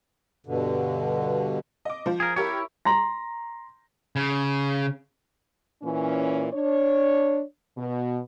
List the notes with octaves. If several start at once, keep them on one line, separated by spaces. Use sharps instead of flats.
G2 B2 D3
D#5 D6
F3 C5
G#4 A#4
E4 G4 A#4 C#5
A#5 C6 A#6
C#3
A#2 E3 C#4
D4 C#5
B2